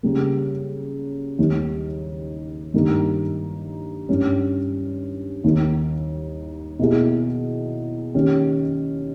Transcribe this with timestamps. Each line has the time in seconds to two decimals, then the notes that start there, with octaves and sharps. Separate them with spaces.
0.03 C#3 G3 A#3
1.39 D#2 D#3 G3 A#3
2.74 G2 D#3 G3 A#3 D#4
4.09 G2 G3 C#4
5.44 D#2 D#3 A#3
6.79 B2 A#3 E4 G#4
8.14 D#3 A#3 C#4 G4